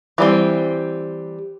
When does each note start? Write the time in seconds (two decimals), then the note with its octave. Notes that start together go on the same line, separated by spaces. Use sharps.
0.18 E3 G3 C4